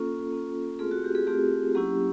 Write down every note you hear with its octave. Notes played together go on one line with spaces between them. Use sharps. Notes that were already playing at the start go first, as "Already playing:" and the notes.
Already playing: A#3 C#4 F4 A4
A#3 C#4 F4
A3 C4 F4 G#4
F#4
G4
G#4
A3 C4 F4 G4
F#3 A#3 C#4 E4 G4